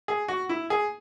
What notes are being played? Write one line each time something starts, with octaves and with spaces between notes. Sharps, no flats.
G#4
F#4
E4
G#4